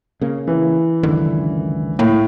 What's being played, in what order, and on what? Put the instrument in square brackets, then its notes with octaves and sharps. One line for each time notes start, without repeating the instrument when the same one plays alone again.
[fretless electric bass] C#3 A#3
[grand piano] E3
[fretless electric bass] C#2 F#2 D3 [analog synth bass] D#3
[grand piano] A2 [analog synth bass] A#3